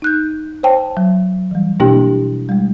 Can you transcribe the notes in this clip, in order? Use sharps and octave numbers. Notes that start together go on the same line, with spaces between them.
D#4 F#6 G6
C5 C#5 G5 A5
F#3
E3 G3
B2 A#3 D4 E4 G4 G5
G3 G#3